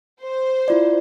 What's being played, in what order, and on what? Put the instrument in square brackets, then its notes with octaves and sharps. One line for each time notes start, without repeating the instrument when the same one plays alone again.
[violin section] C5
[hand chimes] E4 F4 D5